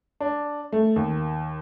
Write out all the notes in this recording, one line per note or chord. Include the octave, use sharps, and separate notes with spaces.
D4
A3
D#2